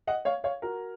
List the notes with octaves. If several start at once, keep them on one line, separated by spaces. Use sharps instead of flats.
D#5 F#5
C#5 F5
C#5 F5
F#4 A#4